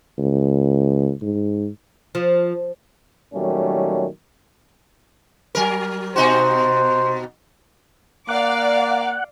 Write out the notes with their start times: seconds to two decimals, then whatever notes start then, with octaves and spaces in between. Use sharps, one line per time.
0.18 C#2
1.22 G#2
2.15 F3
3.34 A#2 D#3 F#3 G3 A3 C#4
5.55 F#3 A#4
6.16 B2 D#4 F#4 C5
8.29 A#3 D5 F5 F#5 D6